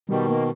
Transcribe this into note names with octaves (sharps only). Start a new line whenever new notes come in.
B2 D#3 G3
A#3